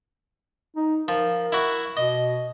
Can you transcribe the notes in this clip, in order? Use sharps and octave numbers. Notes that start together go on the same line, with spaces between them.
D#4
F3 A#4
E4 F#4
B2 D#5